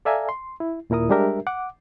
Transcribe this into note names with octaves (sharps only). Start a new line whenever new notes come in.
A4 D5 E5 F5 G#5 A#5
C6
E4
D#2 A#2 E4 A#4 D#6
G3 G#3 D4 G4 A#4 E5
F#5 D6